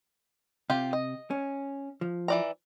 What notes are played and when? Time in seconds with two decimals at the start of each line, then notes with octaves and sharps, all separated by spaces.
0.70 C3 F4 G4
0.93 D#5
1.31 C#4
2.01 F3
2.28 E3 D5 A#5